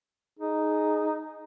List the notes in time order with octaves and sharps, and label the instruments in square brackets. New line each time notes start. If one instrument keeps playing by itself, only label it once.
[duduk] D#4 [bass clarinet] G#4